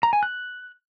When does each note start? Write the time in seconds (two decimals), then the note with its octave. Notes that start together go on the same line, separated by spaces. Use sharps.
0.03 A#5
0.13 G#5
0.23 F#6